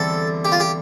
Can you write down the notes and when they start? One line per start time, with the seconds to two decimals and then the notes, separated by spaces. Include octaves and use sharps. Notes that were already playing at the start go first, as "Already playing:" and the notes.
Already playing: E2 D3 G3 C4 A4
0.45 G4
0.52 F4
0.60 G4